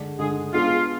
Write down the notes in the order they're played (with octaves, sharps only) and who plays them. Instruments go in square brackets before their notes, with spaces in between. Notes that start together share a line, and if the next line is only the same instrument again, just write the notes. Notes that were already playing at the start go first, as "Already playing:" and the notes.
Already playing: [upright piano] D3 G#3 D4
[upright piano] D3 G#3 D4 [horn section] G#4
[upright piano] G#3 B3 D4 G#4 [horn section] F4